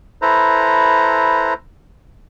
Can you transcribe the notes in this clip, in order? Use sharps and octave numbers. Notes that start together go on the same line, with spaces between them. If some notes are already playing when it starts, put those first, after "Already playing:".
E4 A4 B4 C5 A#5